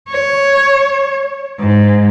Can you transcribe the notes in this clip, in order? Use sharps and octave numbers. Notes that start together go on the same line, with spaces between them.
C#5
G#2